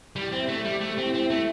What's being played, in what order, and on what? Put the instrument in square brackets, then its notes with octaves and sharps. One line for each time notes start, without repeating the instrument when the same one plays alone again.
[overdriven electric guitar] G3 [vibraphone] E4
[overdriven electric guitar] C4
[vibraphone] E5
[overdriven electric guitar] A3
[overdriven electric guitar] G3 [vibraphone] C5
[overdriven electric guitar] A3 [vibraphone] G4
[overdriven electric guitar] C4
[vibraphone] E4
[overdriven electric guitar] C4
[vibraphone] E5
[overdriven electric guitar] A3